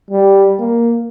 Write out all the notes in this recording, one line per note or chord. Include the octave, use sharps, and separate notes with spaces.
G3
A#3